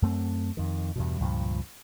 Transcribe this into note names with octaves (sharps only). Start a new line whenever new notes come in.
F#2 A3 C4
F2 D#3
E2 G2 B2
C#2 G2 A#2 F3